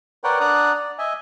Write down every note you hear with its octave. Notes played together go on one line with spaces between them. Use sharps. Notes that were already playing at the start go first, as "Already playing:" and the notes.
A#4 B4 C#5 D5 F#5 G5
D4 D5 F#5 A#5 D#6 F#6
D5
D#5 E5 G#5